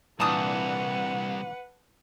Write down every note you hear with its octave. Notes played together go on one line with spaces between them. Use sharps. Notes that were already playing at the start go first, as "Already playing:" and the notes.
C2 A#2 E3 D4 B4 F#5 A5 D#6